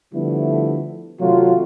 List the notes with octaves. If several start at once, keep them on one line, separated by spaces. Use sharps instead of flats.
D3 F3 G3 A3 B3 E4
C3 D#3 F#3 A3 F4